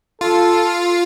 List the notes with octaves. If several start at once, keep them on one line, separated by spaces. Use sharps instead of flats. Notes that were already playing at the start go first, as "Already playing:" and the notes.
F4 A4